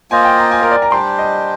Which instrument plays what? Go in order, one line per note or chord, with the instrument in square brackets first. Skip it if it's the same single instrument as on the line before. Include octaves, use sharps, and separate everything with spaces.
[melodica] A#3 F4 C5 D#5 [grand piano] G#5
[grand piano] G5
A#5
G#5
A#4
D5
A#5
[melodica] G3 D4 G4 C5 [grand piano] C6
[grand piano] D#5